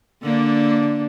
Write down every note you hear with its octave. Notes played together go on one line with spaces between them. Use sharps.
D3 A#3 D4